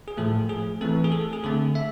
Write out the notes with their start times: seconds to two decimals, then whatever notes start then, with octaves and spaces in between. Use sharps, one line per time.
0.08 G#4
0.17 A2 F3 A3 A4
0.49 G#4
0.81 E3 A3 C4 A4
1.04 G#4
1.12 A4
1.33 G#4
1.44 D3 A3 C4 A4
1.75 E5